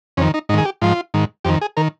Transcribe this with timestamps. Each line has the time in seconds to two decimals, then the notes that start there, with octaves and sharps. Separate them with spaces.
0.17 F2 C#4
0.21 D#3
0.34 D#4
0.49 G#2 D#4
0.54 D#3 G#4
0.65 G4
0.82 G#2 F3 F4
1.14 G#2 D#3
1.45 F2 D#3 G4
1.61 G#4
1.77 D#3 A#4